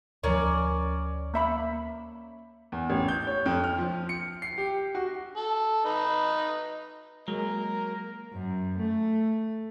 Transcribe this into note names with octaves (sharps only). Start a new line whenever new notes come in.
D2 F3 C#4 A#4 D5
A#3 E5 B5
E2
A1
G6
C#5
F2
F6
F3
C#7
C7
G4
F#4
A4
D#4 B4
F#3 G#3 A#3 A#4
F#2
A3